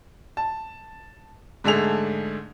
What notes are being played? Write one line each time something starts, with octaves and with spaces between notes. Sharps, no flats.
A5
G#2 D3 A3 G#4 F7